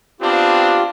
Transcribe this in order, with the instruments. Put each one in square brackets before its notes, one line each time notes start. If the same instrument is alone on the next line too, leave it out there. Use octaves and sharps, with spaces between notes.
[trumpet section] B3 C4 D4 [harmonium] F4 G4